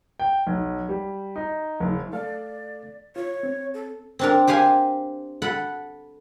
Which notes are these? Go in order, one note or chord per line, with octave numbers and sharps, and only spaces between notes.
G5
B1
G3
D#4
F#1
A3 A4 D5 F5
F4 C#5
C4
A4
C4 D4 A#4
G4 C5 F5 G#5
A4 F#5 B5